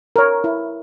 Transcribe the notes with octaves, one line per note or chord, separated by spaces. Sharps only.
A#4 C#5
E4